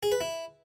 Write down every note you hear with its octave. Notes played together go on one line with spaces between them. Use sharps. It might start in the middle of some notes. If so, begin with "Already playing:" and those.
G#4
B4
E4